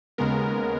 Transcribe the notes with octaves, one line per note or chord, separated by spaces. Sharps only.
D#2 C#3 G#3 B3 A#4